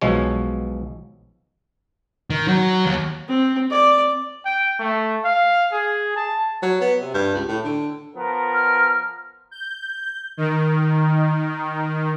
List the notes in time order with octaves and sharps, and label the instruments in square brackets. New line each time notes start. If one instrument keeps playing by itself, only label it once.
[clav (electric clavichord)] B1 B2 F3 G#3 C#5 G#5
[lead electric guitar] D#3
F#3
D#2
[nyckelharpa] C4
D5
[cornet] G5
A3
F5
G#4
A5
[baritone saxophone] F#3
B3
C3
G2
C#2
A2
D3
[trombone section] F3 B3 A#4
[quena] F6
[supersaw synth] G6
D#3